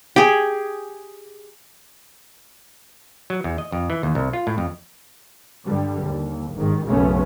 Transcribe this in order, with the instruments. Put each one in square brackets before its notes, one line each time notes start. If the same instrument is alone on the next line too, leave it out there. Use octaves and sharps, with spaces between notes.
[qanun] G4 G#4
[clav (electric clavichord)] F#3
E2
D#5
F2
E3
D#2
C2
F4
A2
F2
[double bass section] G2 D3 G3
D#2
G1 G#2 D#3
B1 F#2 C#3 A3 B3 C#4